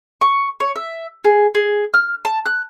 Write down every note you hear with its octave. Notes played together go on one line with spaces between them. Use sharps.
C#6
C#5
E5
G#4
G#4
F6
A5
F#6